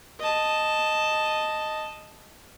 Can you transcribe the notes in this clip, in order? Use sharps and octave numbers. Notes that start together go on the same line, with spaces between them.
D#5 A5